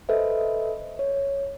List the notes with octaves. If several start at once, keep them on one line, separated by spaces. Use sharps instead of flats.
A4 B4 C5 D#5 E5
C#5